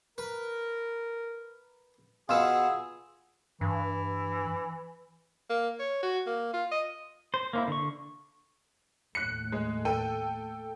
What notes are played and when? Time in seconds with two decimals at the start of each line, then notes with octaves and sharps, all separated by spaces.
0.18 A#4 B4
2.29 B2 B3 F4 G#4 E6
3.61 G2 E3
5.50 A#3
5.79 C#5
6.03 F#4
6.27 A#3
6.54 F4
6.72 D#5
7.34 C5
7.53 A#3 C#4 E4
7.68 D3 C#6
9.15 D#2 A2 A3 F#6 C#7
9.52 G#3
9.85 A4 G5 D#7